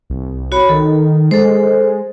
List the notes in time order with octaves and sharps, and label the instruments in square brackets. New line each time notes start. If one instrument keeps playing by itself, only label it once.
[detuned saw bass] C2
[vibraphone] F#4 C#5 B5
[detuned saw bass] D#3 [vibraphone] A4
[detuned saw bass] G#3 [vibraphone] A4 C5